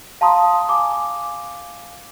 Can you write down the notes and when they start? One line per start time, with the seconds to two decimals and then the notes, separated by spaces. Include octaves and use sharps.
0.21 F5 A5 A#5 C6 D#6
0.69 F5 G#5 D6